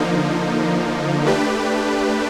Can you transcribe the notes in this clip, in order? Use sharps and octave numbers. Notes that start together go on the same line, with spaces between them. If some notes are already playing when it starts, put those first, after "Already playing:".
Already playing: D3 F3 A#3 D#4
A3 D4 G4 B4